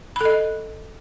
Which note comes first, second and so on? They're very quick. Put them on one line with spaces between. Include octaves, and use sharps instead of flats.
B5 A4 D#5